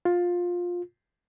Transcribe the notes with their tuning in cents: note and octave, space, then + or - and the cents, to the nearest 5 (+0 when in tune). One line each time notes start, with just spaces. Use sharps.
F4 +15